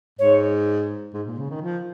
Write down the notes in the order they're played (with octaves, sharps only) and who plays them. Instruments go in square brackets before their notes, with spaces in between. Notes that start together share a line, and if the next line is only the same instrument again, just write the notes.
[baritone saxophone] G#2 [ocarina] C#5
[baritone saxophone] G#2
A#2
C#3
D#3
F3